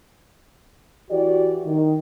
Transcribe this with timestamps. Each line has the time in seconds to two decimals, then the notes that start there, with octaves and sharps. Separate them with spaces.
1.10 E3 F#4 G4 D5
1.66 D#3